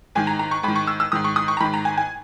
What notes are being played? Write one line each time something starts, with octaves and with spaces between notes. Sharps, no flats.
G#2 D#3 G#5
A#5
A#5
C#6
G#2 D#3 B5
C#6
E6
E6
G#2 D#3 D#6
C#6
D#6
C#6
A#5
G#2 D#3 B5
A#5
G#5
G#5